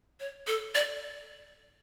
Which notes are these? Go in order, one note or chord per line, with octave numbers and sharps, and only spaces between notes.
C#5
A4
D5